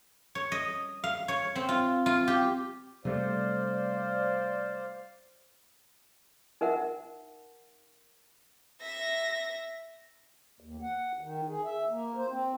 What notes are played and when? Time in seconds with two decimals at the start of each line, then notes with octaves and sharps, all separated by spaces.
0.35 C#5
0.52 D#5
1.04 F5
1.28 C#5
1.56 C4
1.69 F4
2.06 F4
2.27 G4
3.05 C3 G3 A3 C5 D5 F5
6.61 D#4 A#4 E5 F#5
8.82 E5 A#6
10.60 D#2
10.82 F#5
11.21 D#3
11.49 G#4
11.65 E5
11.89 A#3
12.16 C5
12.29 C4